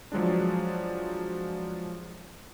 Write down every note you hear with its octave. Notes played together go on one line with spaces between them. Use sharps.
F3 F#3 G#3 D4